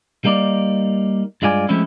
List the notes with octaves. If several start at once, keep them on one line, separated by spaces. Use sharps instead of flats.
G3 A#3 D#4 D5
G2 G#3 F4 D5 G#5
F3 G#3 A3 C4 C#4 E4